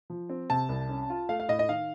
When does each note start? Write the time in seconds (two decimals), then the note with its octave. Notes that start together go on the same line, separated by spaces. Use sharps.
0.10 F3
0.29 C4
0.50 C3 A5
0.69 C2
0.89 C#4
1.10 F4
1.29 A3 F5
1.40 F5
1.48 A2 D#5
1.59 D#5
1.68 D#3 F5